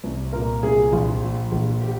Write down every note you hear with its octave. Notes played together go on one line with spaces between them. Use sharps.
C2
A#2 A#4
C2 G#4
A#1 F4
A#2
A#1
G4